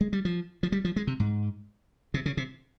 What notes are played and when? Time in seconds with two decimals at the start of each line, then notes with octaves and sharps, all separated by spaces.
0.01 G#3
0.13 G3
0.25 F3
0.63 F3
0.72 G3
0.85 F3
0.96 G#3
1.07 C3
1.20 G#2
2.14 C3
2.26 C#3
2.37 C3